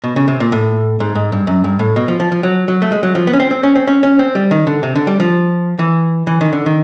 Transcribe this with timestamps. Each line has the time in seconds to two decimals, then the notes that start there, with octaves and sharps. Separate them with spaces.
0.04 B2
0.16 C#3
0.28 C3
0.40 A#2
0.52 A2
1.00 G#2
1.15 G#2
1.32 G2
1.47 F#2
1.64 G2
1.79 A2
1.96 B2
2.08 F3
2.20 F3
2.32 F3
2.43 F#3
2.68 F#3
2.82 A3
2.92 G#3
3.03 F#3
3.15 F3
3.27 B3
3.33 C#4
3.40 C4
3.51 C4
3.63 C#4
3.75 C4
3.87 C#4
4.03 C#4
4.19 C4
4.35 G3
4.51 D#3
4.67 D3
4.83 C3
4.95 D3
5.07 G3
5.20 F3
5.79 E3
6.27 E3
6.41 D#3
6.53 D3
6.66 D#3